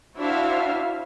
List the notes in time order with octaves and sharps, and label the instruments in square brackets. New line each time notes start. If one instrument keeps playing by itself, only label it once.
[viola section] D4 E4 F#4 C5 E5 F5